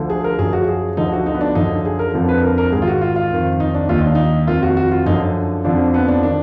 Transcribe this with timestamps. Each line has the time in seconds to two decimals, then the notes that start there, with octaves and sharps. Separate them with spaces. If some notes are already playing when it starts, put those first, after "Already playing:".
Already playing: D2 D3 F3
0.10 G#4
0.24 A#4
0.39 F#2 F3 G#4
0.53 F#4
0.68 G#4
0.97 D2 D3 F3 D#4
1.12 F#4
1.26 D#4
1.35 B3
1.41 D4
1.55 F#2 D3 F3 D#4
1.85 G#4
1.99 A#4
2.14 F2 D3 F3
2.29 B4
2.43 A#4
2.58 A#4
2.72 G#2 D#3 G#4
2.82 F4
2.87 F#4
3.01 F4
3.16 F4
3.31 F2 D#3
3.60 D#4
3.74 D4
3.89 D#2 D#3 F4
3.98 D#4
4.06 D4
4.15 D#4
4.47 F2 D#3 F4
4.63 F#4
4.77 F#4
4.92 F4
5.06 F#2 D3 F3 D#4
5.65 F2 D3 F3 D4
5.94 B3
6.08 D4
6.23 D#3 D4